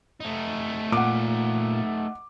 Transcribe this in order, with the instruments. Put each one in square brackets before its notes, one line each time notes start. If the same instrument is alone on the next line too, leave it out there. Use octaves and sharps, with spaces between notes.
[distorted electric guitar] A3 D#4
[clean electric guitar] A#2 [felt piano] F#5 D6